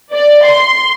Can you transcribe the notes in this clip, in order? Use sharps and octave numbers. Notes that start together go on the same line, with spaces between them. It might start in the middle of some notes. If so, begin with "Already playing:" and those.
D5
C6